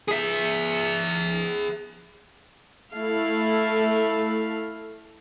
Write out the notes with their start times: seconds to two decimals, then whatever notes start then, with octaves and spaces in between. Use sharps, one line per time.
0.08 G#4 E5
2.95 A3 E4 A4 F5